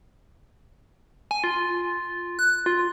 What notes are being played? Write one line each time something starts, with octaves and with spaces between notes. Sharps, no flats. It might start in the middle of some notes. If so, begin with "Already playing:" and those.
G#5
F4
F#6
F4